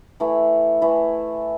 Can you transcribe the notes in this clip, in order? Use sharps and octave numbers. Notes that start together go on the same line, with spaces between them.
E3 A3 E4
E3 A3 E4